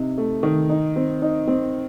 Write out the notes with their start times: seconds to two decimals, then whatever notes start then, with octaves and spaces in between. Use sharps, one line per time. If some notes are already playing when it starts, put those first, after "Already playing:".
Already playing: C3 D#4
0.18 A3
0.43 D#3
0.69 D#4
0.96 C4
1.22 D#4
1.47 C4